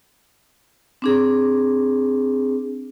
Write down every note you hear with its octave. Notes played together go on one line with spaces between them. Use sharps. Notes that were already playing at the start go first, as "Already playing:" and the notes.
C4 D4 G#4